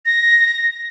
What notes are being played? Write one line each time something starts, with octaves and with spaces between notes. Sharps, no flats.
A#6